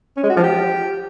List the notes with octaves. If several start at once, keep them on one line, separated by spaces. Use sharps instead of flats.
C#4
G#3
F#4
F3
G4